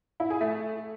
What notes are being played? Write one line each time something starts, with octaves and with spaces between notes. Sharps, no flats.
E4
G#4
A3